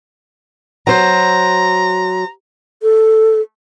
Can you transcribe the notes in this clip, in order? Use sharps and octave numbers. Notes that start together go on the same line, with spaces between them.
F#3 C5 A#5
A4